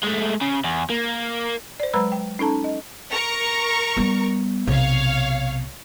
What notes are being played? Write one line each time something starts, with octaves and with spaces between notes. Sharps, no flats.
G#3 A3
C#3
E2
A#3
C5 D5
F#3 G#3 B4 A#5 B5 E6
G5
C#4 D#4 A4 A5 A#5
D#5
A#4 A#5 C#6
G3 B3
B1 C3 C#5 F5